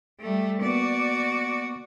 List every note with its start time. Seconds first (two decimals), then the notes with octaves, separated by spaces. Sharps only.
0.20 G3 A3
0.61 A#3 B3 F#4 D5